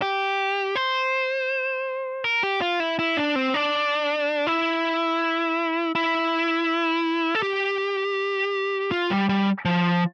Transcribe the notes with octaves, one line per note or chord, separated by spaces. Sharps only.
G4
C5
A#4
G4
F4
E4
E4
D4
C4
D4
E4
E4
A4
G4
F4
G3
G3
F3